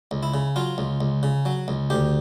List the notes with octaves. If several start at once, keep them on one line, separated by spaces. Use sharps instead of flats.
C#2
E4
C#3
F#3 F4
C#2
C#2
C#3
F#3
C#2
D2 G4